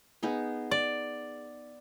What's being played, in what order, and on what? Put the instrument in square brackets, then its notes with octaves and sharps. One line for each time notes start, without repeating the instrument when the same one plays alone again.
[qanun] B3 D#4 G#4
[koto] D5